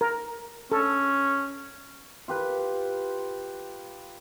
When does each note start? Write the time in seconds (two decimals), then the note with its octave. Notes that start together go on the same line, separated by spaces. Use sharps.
0.01 A#4
0.72 C#4 A4
2.28 F4 G4 B4